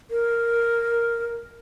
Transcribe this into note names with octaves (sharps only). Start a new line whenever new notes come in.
A#4